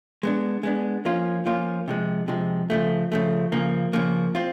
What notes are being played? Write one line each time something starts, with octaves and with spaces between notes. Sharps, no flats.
G#3 B3 D4
G#3 B3 D4
F3 A#3 C#4 F4
F3 A#3 C#4 F4
C3 F3 G#3
C3 F3 G#3
C#3 F3 A3
C#3 F3 A3
C#3 F3 A#3
C#3 F3 A#3
C4 F4